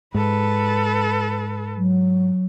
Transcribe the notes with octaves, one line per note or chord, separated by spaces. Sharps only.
G#2 A4 B4
F#3